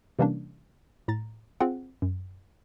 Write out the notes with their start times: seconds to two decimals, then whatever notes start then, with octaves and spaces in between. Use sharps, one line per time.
0.19 C3 E3 G3 A#3 C#4 D4
1.08 A2 A#5 A6
1.60 C4 F4 G#4 F#5
2.02 F#2